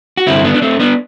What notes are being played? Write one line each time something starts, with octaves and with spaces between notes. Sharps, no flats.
F#4
G2 D3 C4 E4
B3 D4
D4
A3 C4
B3 D4